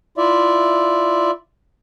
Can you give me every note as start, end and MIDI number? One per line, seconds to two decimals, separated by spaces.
0.18 1.31 64
0.18 1.31 65
0.18 1.31 74
0.18 1.31 76